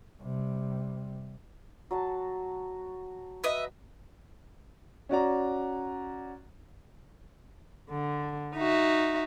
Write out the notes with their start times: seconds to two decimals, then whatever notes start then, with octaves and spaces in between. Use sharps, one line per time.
0.22 C3 G3
1.91 F#3 F#4 A5
3.44 B4 D#5 E5
5.09 C#4 F#4 D5 A#5
7.89 D3
8.57 D#4 F#4 E5